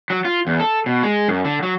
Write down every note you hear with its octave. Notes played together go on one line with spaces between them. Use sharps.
F#3
F4
E2
A4
B2
G#3
F#2
D3
F#3